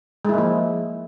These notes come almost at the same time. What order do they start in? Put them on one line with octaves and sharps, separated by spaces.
G#3 E4 A#3 F3